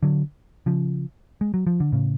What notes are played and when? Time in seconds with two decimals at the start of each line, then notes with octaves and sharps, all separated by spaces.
0.03 D3 F#3
0.66 C#3 F3
1.41 G#3
1.54 F#3
1.67 F3
1.80 D3
1.92 A2 C#3